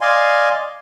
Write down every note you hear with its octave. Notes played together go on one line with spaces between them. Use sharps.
D5 D#5 F5 G#5 C6